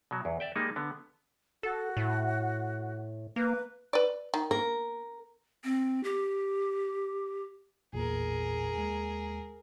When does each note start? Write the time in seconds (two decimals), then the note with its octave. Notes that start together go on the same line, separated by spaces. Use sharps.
0.11 B2 F#3
0.25 E2
0.40 D5 E5 G5
0.56 G3 G#3 A#3 D#4
0.76 D3 B3
1.63 F#4 A4
1.97 A2
3.36 A#3 B4
3.93 B4 D5
4.34 D#3
4.51 A#3 A#4
5.64 C4
6.04 G4
7.93 A1 E2 A#2 G#4 A#4
8.73 D#2 G#3